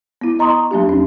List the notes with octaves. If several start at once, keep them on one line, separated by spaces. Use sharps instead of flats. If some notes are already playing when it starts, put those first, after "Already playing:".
B3 E4
D#5 A#5 C6 C#6 D#6
F#3 A#3 D4 G4
E2 C#4